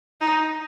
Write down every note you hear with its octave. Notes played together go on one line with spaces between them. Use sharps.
D#4